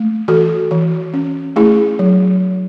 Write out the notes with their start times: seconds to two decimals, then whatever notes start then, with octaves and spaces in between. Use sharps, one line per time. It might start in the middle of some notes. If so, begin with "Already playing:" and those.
Already playing: A3
0.28 E3 F#4 A4
0.71 E3
1.14 C#4
1.56 A3 E4 G#4
1.99 F#3